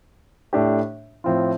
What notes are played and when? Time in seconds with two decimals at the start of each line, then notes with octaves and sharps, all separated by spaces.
0.53 A2 A3 D4 G4
1.24 A2 F3 C4 F4